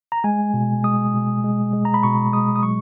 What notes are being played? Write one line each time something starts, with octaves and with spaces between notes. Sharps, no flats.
A#5
G#3 G#5
B2
G#3 D#6
B2
G#3
G#3
A#5
B5
B2 C#6
G#3 D#6
D#6
F#3 C#6